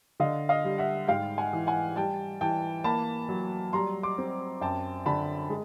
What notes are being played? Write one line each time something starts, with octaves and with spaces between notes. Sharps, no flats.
D3 D#5 F5
D#5 F5
G3
E5 F#5
G#2 F5 G5
F#5 G#5
E3
F#5 G#5
G3 G5 A5
E3 G5 A5
A#3 A5 B5
F#3
G3 A#5 C6
C6 D6
C4
F#2 G5 A5
D3 A5 B5
G#3